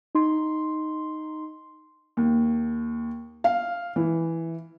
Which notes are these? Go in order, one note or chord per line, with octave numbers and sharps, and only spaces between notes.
D#4 C6
D#2
F5
E3